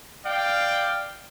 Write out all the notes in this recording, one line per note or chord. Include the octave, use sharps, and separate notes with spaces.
D5 F5 G5